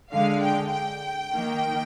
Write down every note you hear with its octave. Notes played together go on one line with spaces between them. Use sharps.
D3 G#3 F5
G5
G5
D#3 A#3